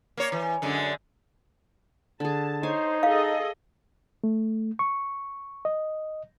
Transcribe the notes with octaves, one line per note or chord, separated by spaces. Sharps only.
A#3 C#5
E3
F#2 D3 G#3
D3 G#4 A5
D#4 C5 C#5 G#5 A5
G#4 A4 D#5 F5
A3
C#6
D#5